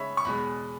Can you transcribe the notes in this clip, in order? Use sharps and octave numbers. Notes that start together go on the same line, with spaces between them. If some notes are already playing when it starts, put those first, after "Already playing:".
Already playing: C#3 G#3 D#4 C#5 E5 B5
C#6
E2 B2 G#3 B5